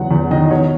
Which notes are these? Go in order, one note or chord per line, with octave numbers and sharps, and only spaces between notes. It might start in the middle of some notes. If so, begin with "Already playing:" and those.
Already playing: E2 F#3 F#5
E2
D#3 D#5
D#5
B2 C#5